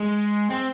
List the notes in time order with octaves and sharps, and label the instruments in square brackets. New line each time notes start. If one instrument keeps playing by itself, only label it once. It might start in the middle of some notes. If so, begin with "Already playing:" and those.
Already playing: [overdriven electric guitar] G#3
C4